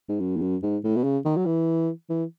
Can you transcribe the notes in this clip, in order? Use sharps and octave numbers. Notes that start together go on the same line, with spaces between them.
G#2
F#2
E2
F#2
G#2
A2
B2
C#3
D#3
F#3
E3
E3